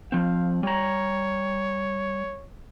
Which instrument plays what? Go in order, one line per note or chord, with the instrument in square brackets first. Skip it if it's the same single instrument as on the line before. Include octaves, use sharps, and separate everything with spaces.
[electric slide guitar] F3 C4 [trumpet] F5
[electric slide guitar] G3 A#5 [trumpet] C#5